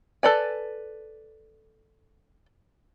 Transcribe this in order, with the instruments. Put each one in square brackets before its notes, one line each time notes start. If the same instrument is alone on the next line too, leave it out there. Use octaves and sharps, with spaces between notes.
[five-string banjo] A4 B4 D5 G#5